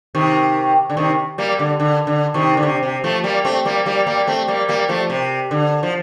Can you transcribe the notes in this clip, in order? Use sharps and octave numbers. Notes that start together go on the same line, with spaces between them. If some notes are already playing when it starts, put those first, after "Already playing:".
C3 D#3
D3
C3 D#3
G3 A#3
D3
D3
D3
C3 D#3
D3
C3
C3
F3 A3
G3 A#3
A3 C4
G3 A#3
G3 A#3
G3 A#3
A3 C4
G3 A#3
G3 A#3
F3 A3
C3
D3
F3